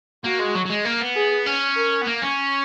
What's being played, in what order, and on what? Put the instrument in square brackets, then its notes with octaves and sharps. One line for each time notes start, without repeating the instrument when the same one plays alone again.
[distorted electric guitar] A#3 [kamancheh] F#4
[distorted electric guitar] G#3
F#3
F#3
G#3
A#3
B3
[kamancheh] G#4
[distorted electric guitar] C#4
[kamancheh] A#4
[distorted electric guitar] B3
A#3
C#4